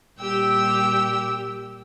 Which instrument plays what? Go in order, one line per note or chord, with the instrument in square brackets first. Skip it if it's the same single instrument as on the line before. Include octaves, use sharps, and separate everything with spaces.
[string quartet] A#2 G3 G4 G5 E6